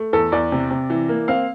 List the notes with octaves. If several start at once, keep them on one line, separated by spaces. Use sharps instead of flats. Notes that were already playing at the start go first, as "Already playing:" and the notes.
Already playing: A3
E2 A4
E2 D5
C3
C3
E3
A#3
C4 F5